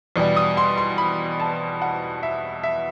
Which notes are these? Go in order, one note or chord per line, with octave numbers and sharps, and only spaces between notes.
E2 B2 G3
D#6
C6
C6
B5
A5
F#5
E5
E5